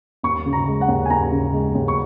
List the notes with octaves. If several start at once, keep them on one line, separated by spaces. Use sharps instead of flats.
D#2 C#6
C#3
A#5
G#3
F#5
D#2
G#5
D#2 A#5
C#3
G#3
D#2
C#6